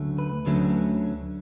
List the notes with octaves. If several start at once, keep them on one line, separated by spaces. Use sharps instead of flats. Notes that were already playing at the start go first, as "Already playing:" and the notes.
Already playing: D2 D3 F#3 A3 C#4
B4
D2 D3 F#3 A3 C#4